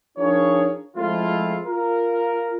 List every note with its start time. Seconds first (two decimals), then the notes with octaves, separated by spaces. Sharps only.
0.18 F3 D4 D#4 G#4 A#4 C#5
0.96 F3 G#3 A3 C4 E4 F4
1.65 F4 A#4